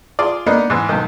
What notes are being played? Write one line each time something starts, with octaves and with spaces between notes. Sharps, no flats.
F4 G#4 D5
A#3 B3 D4 D#4
G#2 E3
B1 D#3